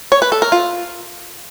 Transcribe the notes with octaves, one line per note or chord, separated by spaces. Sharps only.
C#5
B4
A4
A#4
F4